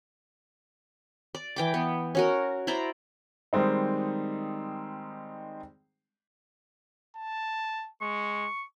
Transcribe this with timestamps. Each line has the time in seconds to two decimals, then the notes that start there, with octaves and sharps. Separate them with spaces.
1.35 D5
1.56 E3 G5 D6
1.74 B3
2.15 C#4 F#4 A#4
2.67 E4 C5 D5 A#5
3.53 D#3 G3 G#3 C4 D#4
7.16 A5
8.01 G#3 C#6